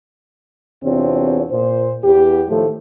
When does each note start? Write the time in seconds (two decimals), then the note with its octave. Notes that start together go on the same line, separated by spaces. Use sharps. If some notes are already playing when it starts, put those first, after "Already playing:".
0.84 E2 C3 C4 D4 F4 C#5
1.51 A#2 C5
2.04 E2 G4
2.49 A2 D#3 F3 A3